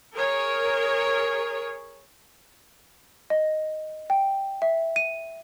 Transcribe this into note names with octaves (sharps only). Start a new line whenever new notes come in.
G#4 A#4 C#5
D#5
G5
E5
D#7